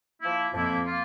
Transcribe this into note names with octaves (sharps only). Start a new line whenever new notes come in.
F3 A#3 E4
F2 F3 A#3 E4
A#3 F4